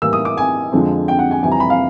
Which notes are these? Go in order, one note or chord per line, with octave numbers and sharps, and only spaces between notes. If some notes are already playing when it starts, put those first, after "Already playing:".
A2 E3 G3 A#3 E6
D#6
D6
G#5
F2 D3 F3 G#3 C4
G5
F#5
G#5
F2 C3 E3 G3 C4 G#5
A#5
B5
F5